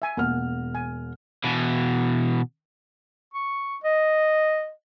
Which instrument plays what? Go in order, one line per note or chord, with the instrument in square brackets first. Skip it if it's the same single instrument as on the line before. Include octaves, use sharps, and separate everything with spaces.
[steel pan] E5 G#5
[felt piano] E1 F#5 F6 [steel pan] A#3
[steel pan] G#5
[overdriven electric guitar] B2 E3
[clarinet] C#6
D#5